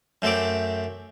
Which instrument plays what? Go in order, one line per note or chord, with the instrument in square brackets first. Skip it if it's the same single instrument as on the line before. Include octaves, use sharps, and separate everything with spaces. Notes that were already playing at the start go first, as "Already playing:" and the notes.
[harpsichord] F#2 A3 C4 E5 D6